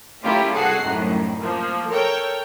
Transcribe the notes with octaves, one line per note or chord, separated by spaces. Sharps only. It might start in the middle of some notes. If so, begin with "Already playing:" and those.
A3 A#3 C#4 E4 F4 G4
C2 F#4 G#4 A4 F#5 C7
C2 F#2 A2 D#3
F3 A#3
A4 A#4 C#5 G5